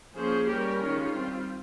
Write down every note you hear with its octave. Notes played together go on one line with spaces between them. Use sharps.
F3 A#3 C#4 G#4 C5
G3 C#4 G4 A#4
D#3 G#3 C#4 F4
G3 C4